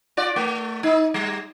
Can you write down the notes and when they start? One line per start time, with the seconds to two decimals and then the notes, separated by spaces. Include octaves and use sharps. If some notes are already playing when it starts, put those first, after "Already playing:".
0.17 F4 D5
0.36 A3
0.83 D#4
1.14 G3